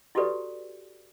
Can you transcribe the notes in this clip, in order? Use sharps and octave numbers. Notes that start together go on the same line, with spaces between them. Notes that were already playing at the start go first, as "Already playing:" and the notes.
E4 F#4 G4 A4 B4 D5